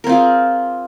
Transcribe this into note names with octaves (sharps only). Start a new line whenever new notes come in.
C4 F4 G#4 A#4